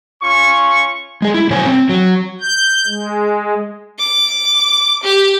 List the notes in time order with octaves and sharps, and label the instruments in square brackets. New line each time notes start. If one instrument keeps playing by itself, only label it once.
[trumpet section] C#4 F4 C#6
[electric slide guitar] G#3 G#4
E4
B2 F#3 C5 C#5 G#5
C4
F#3
[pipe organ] G6
G#3
[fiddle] D6
G4